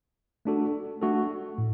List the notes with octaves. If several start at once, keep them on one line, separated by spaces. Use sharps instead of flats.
A3 D4 F#4 A4
A3 D4 F#4 A4
A2